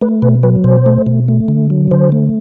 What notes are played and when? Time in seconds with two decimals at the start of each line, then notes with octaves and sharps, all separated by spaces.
0.02 A3 B4
0.22 B2 B4
0.43 F#3 B4
0.64 B2 C5
0.86 A3
1.07 B2
1.28 A3
1.48 D3
1.70 F#3
1.91 D3 C5
2.12 A3